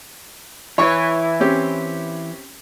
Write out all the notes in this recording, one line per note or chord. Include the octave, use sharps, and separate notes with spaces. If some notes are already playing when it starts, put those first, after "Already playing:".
E3 E4 B4 C#5 C#6
C4 C#4 G4